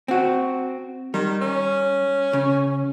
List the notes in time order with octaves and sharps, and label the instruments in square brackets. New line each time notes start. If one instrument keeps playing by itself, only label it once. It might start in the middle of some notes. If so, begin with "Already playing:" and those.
[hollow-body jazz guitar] C4 F#4
[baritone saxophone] D#3 [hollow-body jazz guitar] G3
[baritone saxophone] C#4
[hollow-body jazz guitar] C#3